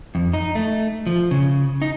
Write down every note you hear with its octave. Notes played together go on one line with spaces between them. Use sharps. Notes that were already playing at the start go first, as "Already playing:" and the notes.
F2
D#4
A3
F3
C#3
D#4